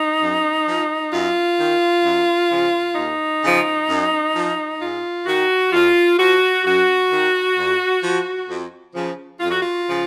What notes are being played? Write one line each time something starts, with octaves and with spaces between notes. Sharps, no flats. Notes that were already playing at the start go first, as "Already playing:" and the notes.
Already playing: D#4
F#2
F3
F#2 F4
D#3
F#2
C#3 F3
D#2 D#4
C#3 F3
F#2
F3
G#2 F4
D#3 F#4
F2 F4
F3 F#4
F#2 F#4
D#3
F2
F3
F2
C#3 F3
F2 F4
F#4
F4
C#3 F3